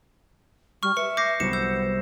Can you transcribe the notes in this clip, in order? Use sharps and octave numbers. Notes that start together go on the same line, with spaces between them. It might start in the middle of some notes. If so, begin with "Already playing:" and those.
G3 C#6 F6
B4 E5 C#7
D6 G6 A#6 C7
C2 F#3 B3 C#7 E7
E6 G6